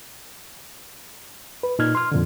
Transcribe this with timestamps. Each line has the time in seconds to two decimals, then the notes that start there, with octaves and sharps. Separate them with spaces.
1.63 B4
1.79 A#2 D#4 F6 G#6
1.95 C6 F6
2.12 F2 A#2 D3